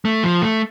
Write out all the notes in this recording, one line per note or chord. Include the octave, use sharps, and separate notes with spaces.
A3
F3
A3